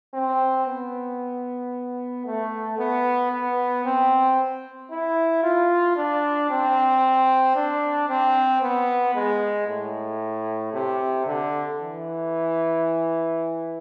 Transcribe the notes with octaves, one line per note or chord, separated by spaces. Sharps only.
C4
B3
A3
B3
B3
C4
E4
F4
D4
C4
D4
C4
B3
G#3
A2
C3
D3
E3